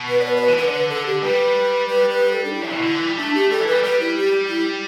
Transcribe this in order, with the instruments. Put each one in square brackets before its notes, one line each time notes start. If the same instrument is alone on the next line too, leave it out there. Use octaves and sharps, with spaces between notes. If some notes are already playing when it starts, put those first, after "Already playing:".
Already playing: [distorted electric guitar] B2
[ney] B4
D5
B4
D5
B4
[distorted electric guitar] E3
[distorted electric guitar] D3 [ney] B4
[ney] D5
B4
A4
G4
[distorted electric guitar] G3 [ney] B4
[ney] B4
B4
A4
D4
E4
[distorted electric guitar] B2
D3
E3
G3
[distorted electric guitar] A3 [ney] D4
[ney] G4
[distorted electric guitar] G3 [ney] A4
[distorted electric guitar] E3
[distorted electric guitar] G3 [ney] B4
[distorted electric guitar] G3 [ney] B4
[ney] E4
G4
E4